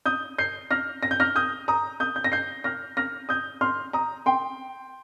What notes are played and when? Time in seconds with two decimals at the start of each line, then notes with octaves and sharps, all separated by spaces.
0.06 D#6 G6
0.38 G6 C7
0.71 F6 A#6
1.03 A#6
1.11 G6
1.20 F6 A#6
1.36 D#6 G6
1.68 A#5 D#6
2.00 D#6 G6
2.16 G6
2.24 A#6
2.32 G6 C7
2.64 F6 A#6
2.97 F6 A#6
3.29 D#6 G6
3.61 C6 F6
3.93 A#5 D#6
4.26 G5 C6